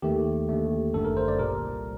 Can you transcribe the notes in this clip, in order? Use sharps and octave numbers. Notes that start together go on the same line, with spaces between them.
D#2 D#3 A3 G4
D#2 D3 A3
G1 F#2 D3 A3 A4
A#4
C5
D5
C2 A#2 G3 A#4